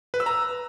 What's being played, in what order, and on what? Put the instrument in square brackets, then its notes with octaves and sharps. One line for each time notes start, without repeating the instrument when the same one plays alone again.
[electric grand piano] B4
E6
A#5